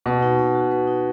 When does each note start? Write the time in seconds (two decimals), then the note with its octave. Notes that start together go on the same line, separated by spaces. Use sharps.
0.06 B2 B4
0.22 D#4
0.38 D#4
0.55 F#4
0.71 B4
0.87 D#4